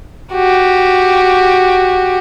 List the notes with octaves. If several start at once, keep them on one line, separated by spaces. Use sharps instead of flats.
F#4 G4